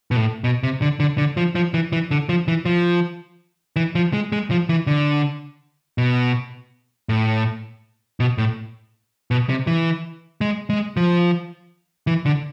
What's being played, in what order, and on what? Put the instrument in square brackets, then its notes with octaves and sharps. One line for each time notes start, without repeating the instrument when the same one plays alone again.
[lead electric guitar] B2
A2
B2
C3
D3
D3
D3
F3
F3
E3
E3
D3
F3
E3
F3
E3
F3
G#3
G#3
F3
E3
D3
B2
A2
B2
A2
B2
C3
E3
G#3
G#3
F3
E3
D3